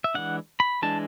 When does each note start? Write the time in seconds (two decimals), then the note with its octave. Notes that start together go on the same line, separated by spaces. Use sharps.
0.04 E5
0.14 E3 G#3 D4 F#5
0.60 B5
0.82 E3 G#3 D4 A5